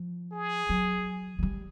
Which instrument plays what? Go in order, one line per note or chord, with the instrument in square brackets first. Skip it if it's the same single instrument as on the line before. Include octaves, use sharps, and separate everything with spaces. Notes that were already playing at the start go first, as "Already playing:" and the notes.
Already playing: [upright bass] F3
[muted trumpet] G#4
[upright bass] F#3
F#3
G3